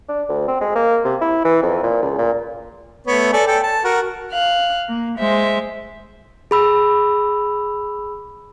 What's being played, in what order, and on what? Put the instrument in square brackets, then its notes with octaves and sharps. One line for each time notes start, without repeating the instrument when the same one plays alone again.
[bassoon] D4
D2
C4
G#3
A#3
C3
E4
E3
F2
A#2
C#2
A#2
[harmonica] A3 B3 C#5
A4 D5 G#5
A4 G5
A5
F#4 A#4
[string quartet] F5 F#6
A#3
G#3 C5 E5
[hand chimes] G#4 B5 E6